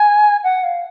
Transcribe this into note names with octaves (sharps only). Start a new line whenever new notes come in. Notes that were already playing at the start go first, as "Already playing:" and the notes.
Already playing: G#5
F#5
F5